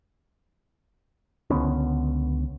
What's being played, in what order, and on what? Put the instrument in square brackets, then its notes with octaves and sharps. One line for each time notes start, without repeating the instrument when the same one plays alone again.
[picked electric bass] C#2 D3 B3 C#4